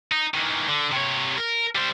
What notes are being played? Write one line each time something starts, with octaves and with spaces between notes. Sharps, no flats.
D#4
D#3 E3
D3
C3 C#5
A#4
G3 C5